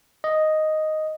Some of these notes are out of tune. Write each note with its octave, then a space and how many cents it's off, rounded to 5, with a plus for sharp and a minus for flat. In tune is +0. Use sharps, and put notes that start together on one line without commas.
D#5 +0